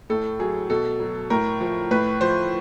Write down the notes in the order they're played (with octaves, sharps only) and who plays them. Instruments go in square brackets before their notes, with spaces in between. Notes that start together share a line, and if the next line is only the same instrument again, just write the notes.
[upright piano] A2 A4
F#3 G#4
B2 A4
F#3
A2 A#4
F3
A2 B4
F3 C5